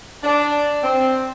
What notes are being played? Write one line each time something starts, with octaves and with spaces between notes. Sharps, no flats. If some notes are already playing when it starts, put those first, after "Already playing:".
D4
C4